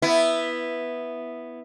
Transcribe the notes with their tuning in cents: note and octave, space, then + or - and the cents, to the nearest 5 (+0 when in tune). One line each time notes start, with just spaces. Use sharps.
B3 +0 E4 +0